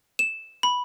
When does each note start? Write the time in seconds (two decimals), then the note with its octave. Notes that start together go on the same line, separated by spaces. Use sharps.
0.19 E7
0.63 B5